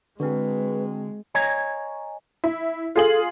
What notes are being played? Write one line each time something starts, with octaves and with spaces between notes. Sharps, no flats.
D3 G#3 C4 D4 F#4 G#4 B4
C#5 D#5 G#5 A#5
E4
F4 G#4 A4 F#7